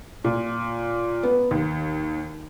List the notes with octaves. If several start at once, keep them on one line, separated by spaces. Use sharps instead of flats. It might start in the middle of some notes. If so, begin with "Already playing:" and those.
A#2
B3
D#2